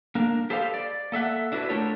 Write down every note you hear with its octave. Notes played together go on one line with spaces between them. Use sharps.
A#3 D4 A#4
G4 A4 B4 C5 D#5 F5
D5
A#3 A4 E5 F#5
D4 E4 F#4 A#4 B4
A3 D4 F4 A4 A#4 C#5